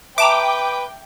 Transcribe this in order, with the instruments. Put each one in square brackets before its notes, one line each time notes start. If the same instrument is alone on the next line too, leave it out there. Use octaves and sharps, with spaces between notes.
[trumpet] B4 [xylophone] E5 A5 A#5 [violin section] G5 [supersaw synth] D6